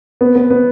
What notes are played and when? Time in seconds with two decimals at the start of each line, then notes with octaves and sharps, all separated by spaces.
0.21 B3
0.36 B3
0.50 B3